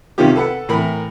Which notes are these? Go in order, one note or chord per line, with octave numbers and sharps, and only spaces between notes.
C3 D#3 A#3 C#4 F4 G4
A4 B4 F#5
A2 E3 A#4 B5